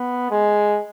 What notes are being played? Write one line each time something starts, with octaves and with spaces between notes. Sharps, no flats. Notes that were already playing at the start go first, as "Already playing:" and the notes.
Already playing: B3
G#3